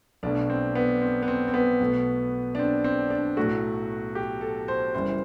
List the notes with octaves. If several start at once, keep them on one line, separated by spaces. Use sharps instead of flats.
B1 B2 A3 D4
C4
B3
C4
B3
C4
C4
B3
B1 B2 A3
D4
C4
C4
D4
B1 A2 F#3 A3 F#4
G4
A4
C5
F#1 F#2 E3 G3 C5